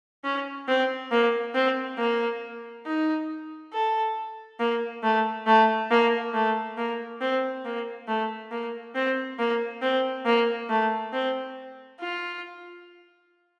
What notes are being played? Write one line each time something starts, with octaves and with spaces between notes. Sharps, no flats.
C#4
C4
A#3
C4
A#3
D#4
A4
A#3
A3
A3
A#3
A3
A#3
C4
A#3
A3
A#3
C4
A#3
C4
A#3
A3
C4
F4